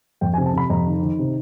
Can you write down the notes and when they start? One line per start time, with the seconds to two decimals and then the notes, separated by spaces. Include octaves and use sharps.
0.21 F2 G5
0.34 G#5
0.38 C3
0.46 A5
0.53 C3 B5
0.70 F2 A#5
0.87 D#3
1.03 D#3
1.19 C3